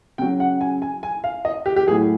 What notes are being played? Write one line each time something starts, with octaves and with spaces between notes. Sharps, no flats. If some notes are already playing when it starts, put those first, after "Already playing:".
C#3 F#3 G5
F#5
G#5
G#5
G#5
F5
D#5
G4
G4
A2 F#3 G#4